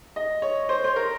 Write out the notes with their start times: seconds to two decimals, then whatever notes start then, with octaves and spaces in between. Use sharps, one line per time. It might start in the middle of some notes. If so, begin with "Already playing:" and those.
0.16 D#5
0.42 C#5
0.69 C5
0.84 C5
0.96 A#4